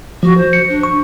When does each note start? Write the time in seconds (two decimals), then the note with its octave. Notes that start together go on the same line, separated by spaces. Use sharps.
0.23 F3 F#4
0.38 C5
0.53 C#7
0.69 D4
0.83 C#6